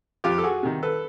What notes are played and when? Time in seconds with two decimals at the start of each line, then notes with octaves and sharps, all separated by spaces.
0.24 F2 F4 G4
0.38 A4
0.43 F#4 G#4
0.63 C3 D#3
0.83 A4 B4